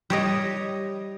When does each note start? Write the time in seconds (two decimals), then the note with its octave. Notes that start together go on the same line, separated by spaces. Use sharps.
0.10 G3 C#5 D#5